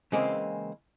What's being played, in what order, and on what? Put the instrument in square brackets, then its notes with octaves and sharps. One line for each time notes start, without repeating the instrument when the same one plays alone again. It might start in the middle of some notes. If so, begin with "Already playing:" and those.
[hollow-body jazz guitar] C#3 E3 G#3 A#3 C4